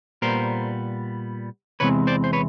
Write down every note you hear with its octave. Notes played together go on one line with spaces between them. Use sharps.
A#2 G3 B3 A#4 C5
E2 C3 E3 G#3 C4 B4 C#5
C5 D5
C5
B4 C#5